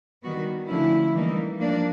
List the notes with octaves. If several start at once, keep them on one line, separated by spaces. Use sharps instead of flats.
D#3 G3 B3 F#4
D3 F3 A3 C#4 E4
E3 G3 A#3 D#4
F3 A#3 D4